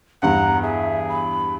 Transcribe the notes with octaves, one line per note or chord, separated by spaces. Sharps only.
E2 G2 F#5 A#5
G#4 E5
B5